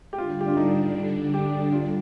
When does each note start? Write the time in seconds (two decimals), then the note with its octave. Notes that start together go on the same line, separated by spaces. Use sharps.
0.13 G4
0.18 D3 G3 D4 F4
0.41 G4
0.48 F4
0.57 D#4
1.34 G4
1.72 F4